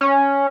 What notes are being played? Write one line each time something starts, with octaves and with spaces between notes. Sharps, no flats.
C#4